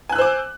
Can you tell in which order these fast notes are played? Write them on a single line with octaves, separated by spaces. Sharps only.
G#5 F#6 E6 C5 D6